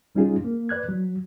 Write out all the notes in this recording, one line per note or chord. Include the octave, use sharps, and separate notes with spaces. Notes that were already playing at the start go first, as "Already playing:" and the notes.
C2 G3 C#4 D#4 F4 G#4
A#3
B4 D5 F#6 G#6
F#3